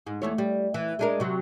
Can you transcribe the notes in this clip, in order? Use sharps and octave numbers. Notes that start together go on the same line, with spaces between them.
G#2
E2 A3 C#5
G3
E3
G#3 D4 A#4
C3 F#3